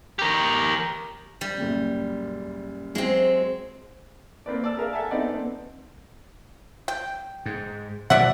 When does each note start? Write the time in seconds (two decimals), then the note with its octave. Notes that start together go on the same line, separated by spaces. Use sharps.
0.19 G4 A#4
1.41 G3
1.57 F#2 A#2 C#3
2.95 F#3 G#3 C4
4.46 A#3 C4 B4 D5
4.64 D5 A5 E6
4.77 G#4 A#4 E5 F5
4.93 A4 E5 F#5 G#5 A5
5.11 B3 C4 D#4 A4 D5 F#5
5.32 B3 C4
6.88 G5
7.46 G#2
8.10 B2 D#3 F#3 D5 E5 F#5